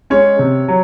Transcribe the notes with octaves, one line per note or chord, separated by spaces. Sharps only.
G#3 C#4 C#5
C3
F#3